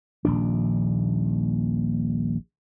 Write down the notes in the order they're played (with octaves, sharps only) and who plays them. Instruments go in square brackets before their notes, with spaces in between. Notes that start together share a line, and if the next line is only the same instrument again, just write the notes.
[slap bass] D#1 A#1 D4